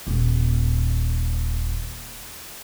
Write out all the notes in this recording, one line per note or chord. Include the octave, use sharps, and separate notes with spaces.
D#1 D#2